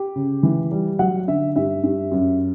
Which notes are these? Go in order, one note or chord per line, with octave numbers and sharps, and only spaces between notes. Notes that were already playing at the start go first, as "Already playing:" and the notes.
Already playing: G4
C#3
E3
G3
F#3 F#5
D3 E5
G2 E5
G2
F#2